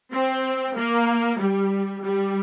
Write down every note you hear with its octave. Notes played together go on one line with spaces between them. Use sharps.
C4
A#3
G3
G3